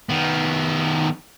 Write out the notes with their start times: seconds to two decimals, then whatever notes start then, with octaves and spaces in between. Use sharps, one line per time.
0.09 D#3 B3